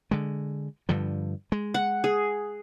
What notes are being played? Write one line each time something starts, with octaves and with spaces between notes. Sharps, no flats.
D3 G#3
G2 D3 F3
G#3
F#5
G#4